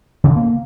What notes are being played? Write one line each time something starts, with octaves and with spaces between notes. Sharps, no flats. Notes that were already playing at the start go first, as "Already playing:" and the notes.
C#3
D3
A#3